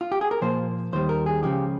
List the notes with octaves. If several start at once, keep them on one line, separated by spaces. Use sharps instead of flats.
F4
G4
G#4
A#4
A#2 F3 A#3 C5
D#2 D#3 G3 C5
A#4
G#4
C#2 C#3 F3 G4